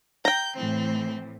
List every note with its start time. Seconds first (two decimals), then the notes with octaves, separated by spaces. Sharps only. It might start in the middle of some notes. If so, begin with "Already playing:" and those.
0.25 G5 A#5 G6
0.56 A2 E3 C4